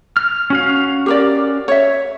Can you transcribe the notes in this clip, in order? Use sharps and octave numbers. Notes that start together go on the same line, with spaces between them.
F6
C#4 F#4 F5
G4 A#4 D5
C#5 E5